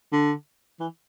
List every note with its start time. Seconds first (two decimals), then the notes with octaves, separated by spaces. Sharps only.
0.12 D3
0.80 E3